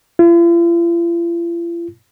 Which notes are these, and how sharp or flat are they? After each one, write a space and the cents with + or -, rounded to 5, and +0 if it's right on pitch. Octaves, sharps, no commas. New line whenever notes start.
F4 -45